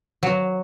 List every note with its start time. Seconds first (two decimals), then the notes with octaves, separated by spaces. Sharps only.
0.23 F#3